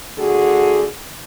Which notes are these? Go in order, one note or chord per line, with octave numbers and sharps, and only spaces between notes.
D3 A3 F#4 G#4